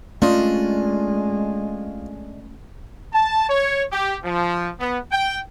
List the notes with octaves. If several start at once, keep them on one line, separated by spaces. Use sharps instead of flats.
G#3 A3 C#4 D4 F4 D#5
A5
C#5
G4
F3
B3
G5